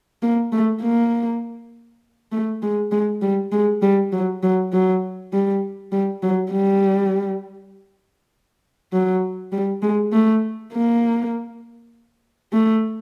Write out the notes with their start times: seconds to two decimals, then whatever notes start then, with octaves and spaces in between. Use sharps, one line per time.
0.23 A#3
0.53 A3
0.82 A#3
2.32 A3
2.63 G#3
2.92 G#3
3.22 G3
3.52 G#3
3.82 G3
4.12 F#3
4.43 F#3
4.72 F#3
5.33 G3
5.92 G3
6.23 F#3
6.52 G3
8.93 F#3
9.52 G3
9.82 G#3
10.12 A3
10.73 A#3
12.53 A3